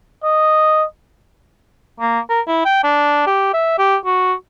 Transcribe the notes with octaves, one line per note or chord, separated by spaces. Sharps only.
D#5
A#3
A#4
E4
G5
D4
G4
E5
G4
F#4